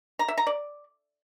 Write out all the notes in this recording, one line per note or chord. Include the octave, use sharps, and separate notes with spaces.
A#5
E5
A#5
D5